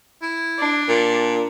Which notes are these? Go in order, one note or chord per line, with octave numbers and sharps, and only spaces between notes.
E4
D4
A#2